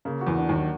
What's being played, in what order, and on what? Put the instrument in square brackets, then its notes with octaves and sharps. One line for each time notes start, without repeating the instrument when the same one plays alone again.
[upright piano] C#3 [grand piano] A#3
[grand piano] F#4
[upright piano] E2 E3
[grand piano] D4
[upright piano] D#2 D#3
[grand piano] F#3